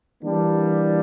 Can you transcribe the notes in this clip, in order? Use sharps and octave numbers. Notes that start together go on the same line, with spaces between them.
E3 G3 A#3 D4